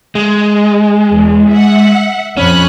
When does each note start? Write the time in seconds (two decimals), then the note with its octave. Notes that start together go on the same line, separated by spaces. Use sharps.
0.15 G#3
1.12 E2
1.51 E5 F#5
2.37 F2 C#4 B5 F#6